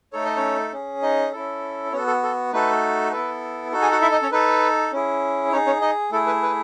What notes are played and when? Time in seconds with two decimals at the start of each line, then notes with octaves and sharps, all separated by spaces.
0.13 A3 D#4 A4 C#5
0.25 D#5
0.37 C#4 C#5
0.73 C#4 G#4
1.02 D#4 D#5
1.33 C#4 E4 A4
1.92 B3 C#4 F#4 A4 C#5
2.07 A4
2.23 A4
2.53 A3 D#4 F#4 A4 B4
3.12 B3 E4 A4 B4
3.72 D#4 F#4 A4
3.82 G#4 G#5
3.92 F#4 F#5
4.02 E4 E5
4.12 D#4 D#5
4.22 C#4 C#5
4.32 D#4 A4 B4
4.92 C#4 E4 G#4
5.52 C#4 D#4 C#5
5.56 G#4
5.66 C#4 C#5
5.81 D#4 D#5
6.11 A3 E4 G#4 A4
6.26 B4
6.43 B4